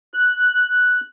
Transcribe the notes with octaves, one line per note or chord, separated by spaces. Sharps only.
F#6